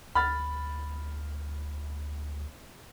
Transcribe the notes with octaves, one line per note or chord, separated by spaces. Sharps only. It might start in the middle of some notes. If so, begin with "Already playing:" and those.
D2 B5 F6 A6